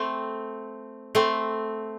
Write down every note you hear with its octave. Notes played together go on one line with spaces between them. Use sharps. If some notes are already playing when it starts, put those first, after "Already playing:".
Already playing: A3 C4
A3 C4